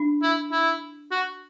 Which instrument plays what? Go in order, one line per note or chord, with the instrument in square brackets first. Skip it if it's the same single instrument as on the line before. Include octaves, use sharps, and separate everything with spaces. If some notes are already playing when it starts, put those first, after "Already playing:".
Already playing: [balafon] D4
[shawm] E4
E4
F#4